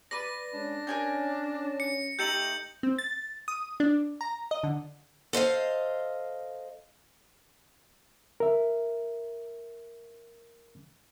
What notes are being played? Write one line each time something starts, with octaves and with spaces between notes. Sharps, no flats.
B4 D5 A#6
G#3 C#4 D4
C#4 A#4 G#5 G6
C#7
A3 D#4 G4 G6 C#7 F#7
C4
A6
D#6
D4
A#5
D#5
D3
A4 C5 D#5 F5
A#4 E5